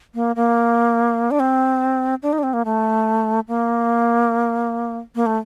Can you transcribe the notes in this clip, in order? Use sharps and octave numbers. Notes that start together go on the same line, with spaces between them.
A#3
A#3
D4
C4
D4
D#4
D4
C4
A#3
A3
A#3
A#3
A3